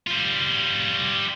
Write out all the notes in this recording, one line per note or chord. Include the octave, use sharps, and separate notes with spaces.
G3 F4